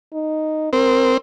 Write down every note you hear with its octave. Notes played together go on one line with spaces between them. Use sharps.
D#4
C4 A#4